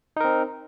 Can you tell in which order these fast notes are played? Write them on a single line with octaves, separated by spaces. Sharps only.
D#4 A#4 C4